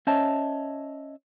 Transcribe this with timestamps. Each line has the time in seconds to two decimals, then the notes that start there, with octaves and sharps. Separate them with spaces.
0.07 C#4 C5 C#5 D#5 E5 A5